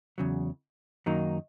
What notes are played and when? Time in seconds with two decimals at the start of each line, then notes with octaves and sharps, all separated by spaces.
0.18 E2 C#3 F#3
1.06 F#2 D#3 F#3 A#3 D#4